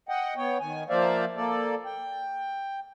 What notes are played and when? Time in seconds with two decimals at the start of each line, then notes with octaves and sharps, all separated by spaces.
0.09 D#5 F#5 G5
0.36 B3 C#5 G5
0.60 D#3 G#5
0.89 F3 A#3 C5 D5 E5 F5
1.36 A#3 A4 D5
1.85 G5